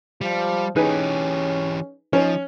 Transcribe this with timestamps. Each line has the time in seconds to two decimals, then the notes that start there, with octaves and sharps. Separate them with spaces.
0.21 F3 G3
0.76 E3 C#4 D#4 G4 G#4 B4
2.13 F3 C#4 D#4